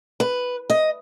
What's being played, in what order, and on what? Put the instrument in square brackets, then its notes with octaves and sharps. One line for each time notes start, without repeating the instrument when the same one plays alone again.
[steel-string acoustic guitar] B4
D#5